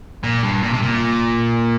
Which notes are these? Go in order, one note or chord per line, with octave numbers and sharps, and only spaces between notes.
A#2
G2
A#2
C3
A#2